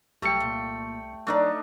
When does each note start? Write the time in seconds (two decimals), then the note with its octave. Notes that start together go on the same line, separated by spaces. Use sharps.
0.22 C2 F#3 A3 G4 G5 C#7
0.40 A#2
1.27 F#3 A3 D4 D#4 C#5 D5